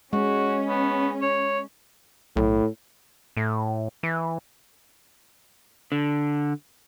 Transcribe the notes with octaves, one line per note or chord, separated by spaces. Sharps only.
G#3 C#4 F#4
B3
C#5
B1 A2
A2
E3
D3